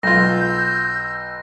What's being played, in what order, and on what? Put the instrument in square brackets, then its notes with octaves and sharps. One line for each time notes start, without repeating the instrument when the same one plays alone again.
[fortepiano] B1 F4 [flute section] E6 G6 [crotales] A#6